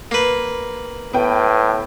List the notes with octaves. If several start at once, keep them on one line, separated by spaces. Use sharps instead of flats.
A#3 B4
A2 B3 G5